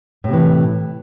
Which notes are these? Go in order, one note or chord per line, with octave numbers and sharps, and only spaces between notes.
A2 C3 E3